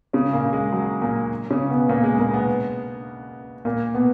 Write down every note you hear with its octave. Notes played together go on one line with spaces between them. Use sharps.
C#3 C#4
A#2 A#3
G#3
F#3
A#2 A#3
C#3 C#4
B2 B3
A#2 A#3
G#3
A#2 A#3
B2 B3
A#2 A#3
B2 B3